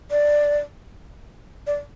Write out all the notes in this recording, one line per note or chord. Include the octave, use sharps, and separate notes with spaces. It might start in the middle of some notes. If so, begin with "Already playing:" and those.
D5
D5